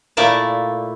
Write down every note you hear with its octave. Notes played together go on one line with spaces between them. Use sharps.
A#2 A3 A#3 E4 D5 A5